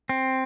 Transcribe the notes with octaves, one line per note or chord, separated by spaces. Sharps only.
C4